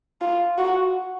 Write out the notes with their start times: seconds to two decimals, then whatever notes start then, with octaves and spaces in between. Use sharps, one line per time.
0.21 F4
0.58 F#4